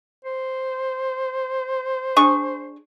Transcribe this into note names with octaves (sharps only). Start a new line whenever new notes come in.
C5
D4 G#4 C#6